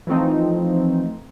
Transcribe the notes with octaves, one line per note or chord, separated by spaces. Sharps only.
E3 F3 A3 C4 D#4